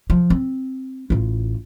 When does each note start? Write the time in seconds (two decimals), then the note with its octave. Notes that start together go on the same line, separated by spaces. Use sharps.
0.10 F3
0.30 C4
1.10 A1 F4